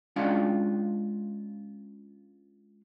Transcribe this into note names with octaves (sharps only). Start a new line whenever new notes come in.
G#3 C#4 D4 F4 F5 F#5